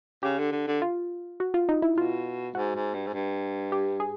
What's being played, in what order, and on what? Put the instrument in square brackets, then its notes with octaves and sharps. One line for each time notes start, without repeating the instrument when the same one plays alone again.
[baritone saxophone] C#3 [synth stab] G4
[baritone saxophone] D3
D3
D3
[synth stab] F4
F#4
F4
D#4
E4
[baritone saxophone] B2 [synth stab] F4
[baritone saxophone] G#2 [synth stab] F#4
[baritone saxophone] G#2
G2
G#2
G2
[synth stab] G4
G#4